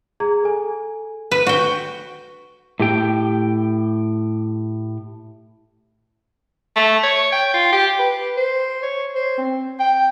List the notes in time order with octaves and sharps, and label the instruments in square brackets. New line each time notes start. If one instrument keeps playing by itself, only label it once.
[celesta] G#4 A#5 G#6
A4 G#5
[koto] B4
F#4 G5
[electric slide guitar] A2 G4 G5
[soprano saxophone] A3
C#5
G5
F4
G4
B4
C5
C#5
C5
C4
G5